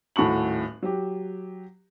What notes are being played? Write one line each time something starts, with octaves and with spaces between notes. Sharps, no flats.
D#1 A2 F#4 C#6 F#7
F#3 G4